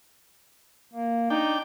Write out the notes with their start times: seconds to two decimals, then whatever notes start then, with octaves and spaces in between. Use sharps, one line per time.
0.93 A#3
1.30 D4 D#4 G5